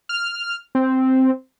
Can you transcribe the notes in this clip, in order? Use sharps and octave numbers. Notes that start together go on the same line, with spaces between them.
F6
C4